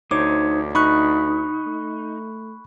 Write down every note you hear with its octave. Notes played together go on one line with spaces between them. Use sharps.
D2 D#4 C5 C#5 D6
D#4 B5 C#6 F#6
A3